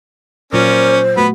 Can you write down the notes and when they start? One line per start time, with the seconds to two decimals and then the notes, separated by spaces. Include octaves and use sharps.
0.53 A#2 F#3 C#4 F4 A#4 C5 D5
1.17 A3 B3 F#4 B5